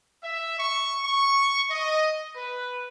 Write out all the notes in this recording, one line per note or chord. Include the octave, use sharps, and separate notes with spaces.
E5
C#6
C#6
D#5
B4